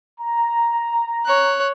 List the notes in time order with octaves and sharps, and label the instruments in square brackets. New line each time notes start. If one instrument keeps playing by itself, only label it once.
[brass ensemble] A#5
[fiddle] C#5 F#6